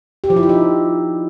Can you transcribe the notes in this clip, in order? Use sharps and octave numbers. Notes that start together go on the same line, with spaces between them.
G4
F3
E4
F3
D#4